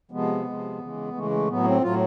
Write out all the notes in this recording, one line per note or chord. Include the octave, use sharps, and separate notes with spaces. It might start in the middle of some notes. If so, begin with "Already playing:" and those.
C3 F3 G#3 B3
C3 F3 G#3
C#3 E3 G#3
C#3 E3 G#3 A3
A3
A2 F#3 B3
C4
A2 F#3 F4